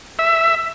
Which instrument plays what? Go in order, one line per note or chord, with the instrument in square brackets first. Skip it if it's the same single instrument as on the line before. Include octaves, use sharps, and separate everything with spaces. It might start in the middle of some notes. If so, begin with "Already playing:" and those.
[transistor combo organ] E5